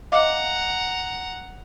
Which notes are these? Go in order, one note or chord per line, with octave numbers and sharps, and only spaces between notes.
D#5 F5 F#5 A#5 D6